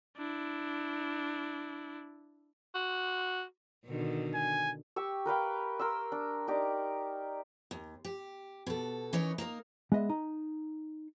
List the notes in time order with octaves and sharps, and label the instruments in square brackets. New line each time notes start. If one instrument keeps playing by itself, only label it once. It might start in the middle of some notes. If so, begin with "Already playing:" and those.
[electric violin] D4 E4
[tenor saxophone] F#4
[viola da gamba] B2 D3 D#3
[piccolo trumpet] G#5
[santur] G4 C#6 E6
A#4 B4 F5 G5
A#4 C6 E6
D4
D#4 G4 D5 A#5
[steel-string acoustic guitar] D#2
G4
B2 A4
E3 C#4 D#4 A#4 C#5
A#3 D#4 A#4
[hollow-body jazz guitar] G#3 B3 D#5 E5
D#4